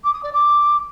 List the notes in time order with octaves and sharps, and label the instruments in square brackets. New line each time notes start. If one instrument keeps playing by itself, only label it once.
[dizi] D6
D#6
D5
D6